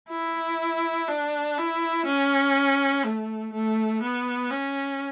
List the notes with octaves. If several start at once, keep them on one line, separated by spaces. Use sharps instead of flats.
E4
D4
E4
C#4
A3
A3
B3
C#4